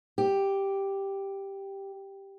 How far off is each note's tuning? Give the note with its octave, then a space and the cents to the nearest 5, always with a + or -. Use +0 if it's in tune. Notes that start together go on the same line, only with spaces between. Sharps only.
G4 +0